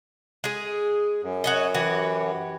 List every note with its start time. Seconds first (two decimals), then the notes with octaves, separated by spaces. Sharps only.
0.44 G#3 G#4
1.23 F#2
1.44 F#4 C#5 D#5
1.74 E3 F#4 G4